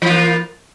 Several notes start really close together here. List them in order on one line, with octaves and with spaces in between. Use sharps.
E3 F4 A#3